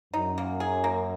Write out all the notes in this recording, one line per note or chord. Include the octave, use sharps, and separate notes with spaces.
F#2 D#4
A#3
G#4
A#3